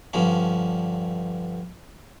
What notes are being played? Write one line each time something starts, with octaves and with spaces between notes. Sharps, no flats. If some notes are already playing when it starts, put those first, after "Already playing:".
G2 D3 F3 C#4